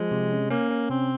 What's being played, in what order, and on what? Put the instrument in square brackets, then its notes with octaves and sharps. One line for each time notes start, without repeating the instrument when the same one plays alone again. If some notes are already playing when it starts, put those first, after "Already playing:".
Already playing: [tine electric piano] F3 [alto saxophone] G#3
[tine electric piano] C3
C#4
[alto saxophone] A#3 [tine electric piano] C#4
[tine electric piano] C#4
[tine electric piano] C3 [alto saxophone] C4